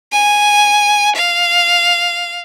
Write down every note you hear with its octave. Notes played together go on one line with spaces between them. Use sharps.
G#5
F5